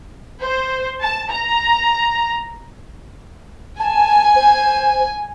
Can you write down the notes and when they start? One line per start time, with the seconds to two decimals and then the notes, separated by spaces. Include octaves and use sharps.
0.42 C5
1.02 A5
1.31 A#5
3.79 G#5 A5
4.36 C5